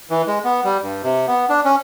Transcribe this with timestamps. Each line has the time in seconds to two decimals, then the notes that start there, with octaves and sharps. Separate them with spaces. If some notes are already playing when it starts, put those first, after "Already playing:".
0.10 E3
0.27 G#3
0.44 B3
0.65 G3
0.83 G2
1.03 C3
1.28 B3
1.49 D4
1.65 C#4